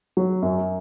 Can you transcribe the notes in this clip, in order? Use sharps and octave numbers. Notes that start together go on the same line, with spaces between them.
F#3
F#2